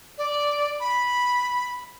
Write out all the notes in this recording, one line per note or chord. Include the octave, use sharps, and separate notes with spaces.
D5
B5